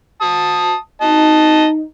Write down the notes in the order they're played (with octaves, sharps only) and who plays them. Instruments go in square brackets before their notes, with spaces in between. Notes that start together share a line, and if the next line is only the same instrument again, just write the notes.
[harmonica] A5 D#6
[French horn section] D#4 [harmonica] D#5 A5